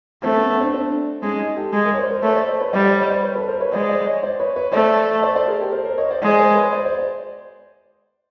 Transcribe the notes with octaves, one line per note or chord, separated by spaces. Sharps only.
A3 C4
B3 C#4
B3 C#4
C4 D4
C4 D4
G#3 C#4 D#4
C#4 D#4
G4 A4
G#3
G#4 A#4
C#5
C5 D5
A#4 C5
A3 B4 C#5
C5 D5
C5 D5
B4 C#5
G3 C5 D5
C5 D5
C#5 D#5
C5 D5
B4 C#5
A4 B4
A#4 C5
B4 C#5
G#3 C5 D5
C5 D5
C#5 D#5
C5 D5
B4 C#5
B4 C#5
A3 C5 D5
C5 D5
C5 D5
G#4 A#4
G4 A4
A#4 C5
A#4 C5
C#5 D#5
C5 D5
G#3 C5 D5
A#4 C5
B4 C#5
C5 D5
C5 D5
C5 D5